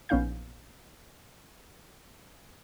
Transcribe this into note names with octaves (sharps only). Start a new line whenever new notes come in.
A#1 B3 C#4 D#4 F5 G6